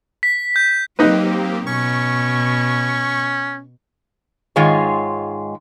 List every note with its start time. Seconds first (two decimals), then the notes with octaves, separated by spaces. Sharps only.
0.23 B6
0.56 G6
0.99 F#3 A#3 C4 D#4 G4 B4
1.67 B2 C#4 C#6
4.56 G#2 D#3 G#3 F4 G#4 C#5